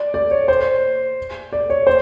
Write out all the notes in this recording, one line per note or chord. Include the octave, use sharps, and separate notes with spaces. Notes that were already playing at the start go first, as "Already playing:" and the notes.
Already playing: D5
D5
C#5
C5
D5
C#5
C5